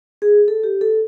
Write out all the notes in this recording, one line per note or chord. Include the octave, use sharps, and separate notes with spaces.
G#4
A4
G4
A4